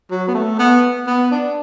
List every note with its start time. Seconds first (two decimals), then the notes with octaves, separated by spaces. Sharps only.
0.10 F#3
0.28 B3
0.34 A3
0.59 B3
1.07 B3
1.31 D4